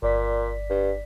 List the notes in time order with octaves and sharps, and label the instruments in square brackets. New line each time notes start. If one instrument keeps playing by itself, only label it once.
[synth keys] G1 D5 B6 [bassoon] A#2
[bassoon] G2